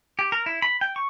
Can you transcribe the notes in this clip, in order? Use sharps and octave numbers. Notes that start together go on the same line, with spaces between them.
G4
A#4
E4
B5
G5
C#6